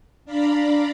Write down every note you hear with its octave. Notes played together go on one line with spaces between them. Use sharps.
D4 D5 F5 A#5 B5